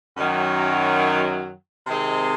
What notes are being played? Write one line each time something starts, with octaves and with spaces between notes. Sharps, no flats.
F#2 D#3 F#3
C3 D#3 G#3 C4